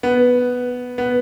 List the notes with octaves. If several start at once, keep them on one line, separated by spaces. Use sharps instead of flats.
B3
B3